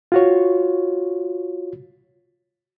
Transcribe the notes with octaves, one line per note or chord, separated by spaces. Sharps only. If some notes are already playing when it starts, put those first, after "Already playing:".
F4 F#4 C#5